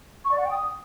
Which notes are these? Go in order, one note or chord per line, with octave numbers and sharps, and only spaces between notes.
C#6
D5
F#5
G5
D#6